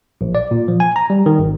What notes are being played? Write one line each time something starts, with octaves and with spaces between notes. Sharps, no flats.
A#1
D5
A#2
F3
G#5
A#5
G3
D#3
G#1